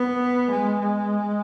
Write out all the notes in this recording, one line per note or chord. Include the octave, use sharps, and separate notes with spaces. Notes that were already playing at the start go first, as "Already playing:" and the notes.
Already playing: B3
G#3
G#3